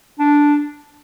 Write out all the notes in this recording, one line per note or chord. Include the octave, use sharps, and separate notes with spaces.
D4